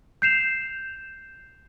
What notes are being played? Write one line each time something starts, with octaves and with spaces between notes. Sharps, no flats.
G6 C7 E7 F7